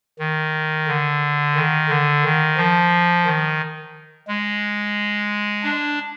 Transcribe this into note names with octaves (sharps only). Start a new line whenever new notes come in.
D#3
D3
D#3
D3
D#3
F3
D#3
G#3
D4